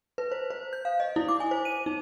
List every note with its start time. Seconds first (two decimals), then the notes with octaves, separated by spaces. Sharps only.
0.18 B4
0.32 C5
0.50 C5
0.73 G6
0.85 F5
1.00 D#5
1.16 E4
1.29 D6
1.40 G#5
1.51 C5
1.65 D#7
1.86 D#4